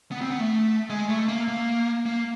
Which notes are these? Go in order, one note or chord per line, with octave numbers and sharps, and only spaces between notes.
B3
C4
B3
A3
G#3
A3
A#3
A#3
A#3